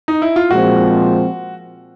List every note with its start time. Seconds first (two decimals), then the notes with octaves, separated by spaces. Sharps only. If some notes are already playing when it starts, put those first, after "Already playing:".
0.08 D#4
0.22 E4
0.36 F4
0.50 A#2 F3 G#3 C4 F#4